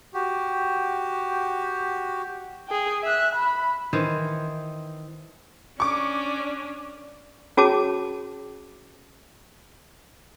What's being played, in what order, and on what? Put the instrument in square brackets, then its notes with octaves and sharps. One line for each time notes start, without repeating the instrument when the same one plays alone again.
[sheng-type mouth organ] F#4 G4
[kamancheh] G#4 G5
E5 F#6
B5
[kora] D#3 E3 C5
[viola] C#4 D4 [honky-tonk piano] C#6 D6
[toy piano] C#4 F#4 G#4 C#5 A5 D6